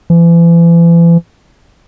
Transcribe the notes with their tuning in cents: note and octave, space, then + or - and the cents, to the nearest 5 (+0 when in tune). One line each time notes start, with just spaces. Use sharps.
E3 +40